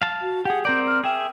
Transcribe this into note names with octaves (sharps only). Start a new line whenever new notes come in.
F5 A5
F#4
G4 G#4 F#5
C4 A#4 D5 G6
F6
G#4 E5 G5